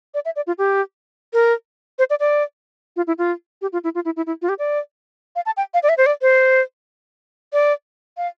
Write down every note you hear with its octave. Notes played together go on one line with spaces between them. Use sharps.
D5
E5
D5
F4
G4
A#4
C5
D5
D5
F4
E4
F4
G4
F4
E4
F4
E4
E4
E4
F4
G4
D5
F5
A5
G5
F5
D5
E5
C5
D5
C5
D5
F5